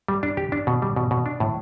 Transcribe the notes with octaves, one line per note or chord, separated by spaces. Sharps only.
G3
D4
G4
D4
B2
G3
B2
B2
D4
A2